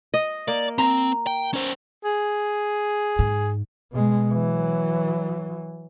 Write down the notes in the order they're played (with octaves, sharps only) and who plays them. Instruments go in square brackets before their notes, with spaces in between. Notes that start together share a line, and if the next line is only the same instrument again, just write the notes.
[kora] D#5
[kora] A#3 [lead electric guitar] D5
[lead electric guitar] C4 [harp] A#5 A#6
[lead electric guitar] G5
C#4 C5
[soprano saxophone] G#4
[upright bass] G#2
[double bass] B2 G#3
E3 F#3